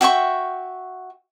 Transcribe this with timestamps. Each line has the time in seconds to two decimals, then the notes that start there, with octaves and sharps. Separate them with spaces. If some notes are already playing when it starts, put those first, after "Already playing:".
0.01 F#4 E5 G5 C#6